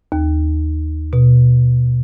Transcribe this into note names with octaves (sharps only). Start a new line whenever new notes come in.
D#2
B2